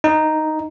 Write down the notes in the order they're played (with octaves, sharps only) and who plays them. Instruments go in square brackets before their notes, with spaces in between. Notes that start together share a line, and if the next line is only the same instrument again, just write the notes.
[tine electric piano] D#4